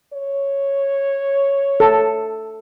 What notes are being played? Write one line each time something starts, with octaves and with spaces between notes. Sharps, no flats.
C#5
A4